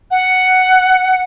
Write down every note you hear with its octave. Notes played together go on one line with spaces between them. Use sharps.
F#5